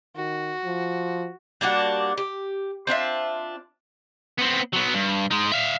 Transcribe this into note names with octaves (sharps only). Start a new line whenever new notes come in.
D#3 F#4
F3
G3 A#3 D4 F#4
G4
C4 D4 F4 E5
B3 C4
F#3 B3
G2
G#3 D#4
E5 F5